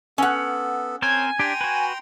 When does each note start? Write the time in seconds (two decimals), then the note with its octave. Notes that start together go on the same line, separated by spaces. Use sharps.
0.18 B3 C#4 A4 F#5
1.02 C4 A#4 C5 C#5 G#5 A5
1.39 D4 G4 G5 A#5 C6
1.61 F#4 B4